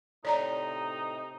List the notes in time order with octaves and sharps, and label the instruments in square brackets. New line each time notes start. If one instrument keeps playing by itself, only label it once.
[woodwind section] A2 C3 D#4 [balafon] C#5 D5 A#5